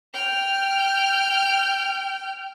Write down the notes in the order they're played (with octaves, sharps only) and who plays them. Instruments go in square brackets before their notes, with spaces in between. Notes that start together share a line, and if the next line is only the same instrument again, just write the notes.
[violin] G5 F6